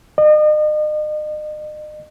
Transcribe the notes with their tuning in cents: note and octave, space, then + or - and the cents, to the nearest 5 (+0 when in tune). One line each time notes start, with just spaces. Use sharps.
D#5 -40